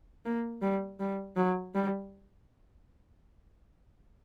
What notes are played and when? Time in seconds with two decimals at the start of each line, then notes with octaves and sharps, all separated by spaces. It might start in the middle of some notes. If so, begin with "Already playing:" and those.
0.25 A#3
0.62 G3
1.00 G3
1.36 F#3
1.74 G3